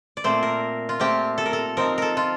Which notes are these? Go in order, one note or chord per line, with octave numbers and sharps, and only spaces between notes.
D5
A#2 A3 C4 C5
A#4
F4
A#2 A3 C4 G4
A4
A#4
A4
F3 C4 D#4 A#4
A4 A#4
F4